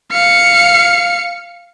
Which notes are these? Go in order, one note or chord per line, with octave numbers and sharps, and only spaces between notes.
F5 C#7